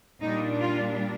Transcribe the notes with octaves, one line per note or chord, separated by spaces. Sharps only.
A#2 G3 D4 D#4
F4